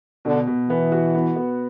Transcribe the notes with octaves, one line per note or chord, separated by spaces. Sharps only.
B2 D3
B2
E3 B3
F#4
B3
B3